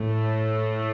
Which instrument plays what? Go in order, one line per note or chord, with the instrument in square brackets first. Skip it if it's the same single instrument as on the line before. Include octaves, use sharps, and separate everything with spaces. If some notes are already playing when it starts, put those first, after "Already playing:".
Already playing: [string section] A2 A3